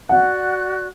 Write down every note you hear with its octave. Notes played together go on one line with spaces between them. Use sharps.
F#4 D5 F#5 F#6